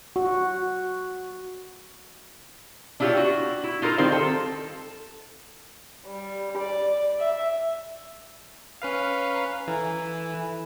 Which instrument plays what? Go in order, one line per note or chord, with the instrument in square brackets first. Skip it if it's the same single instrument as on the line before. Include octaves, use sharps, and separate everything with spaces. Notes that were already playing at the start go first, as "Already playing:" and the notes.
[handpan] F#4
[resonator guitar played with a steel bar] D4 E4 F4 G4 C#5
F#4
E4
D#4 F4 A4 A#4
D#3 G3 C4 D#4 C5 F5
A4
[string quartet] G3
D5
E5
[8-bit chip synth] C#4 B4 F5
[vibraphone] A#5
[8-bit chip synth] E3 [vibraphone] A4 G#5
[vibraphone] B5